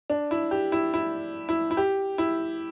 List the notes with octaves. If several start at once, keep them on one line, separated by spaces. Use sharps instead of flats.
D4
E4
G4
E4
E4
E4
E4
G4
E4